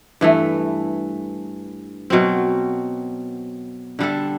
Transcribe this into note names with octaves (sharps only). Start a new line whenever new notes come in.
G2 E3 A3
B2 F#3 C4
D3 G3 D4 A4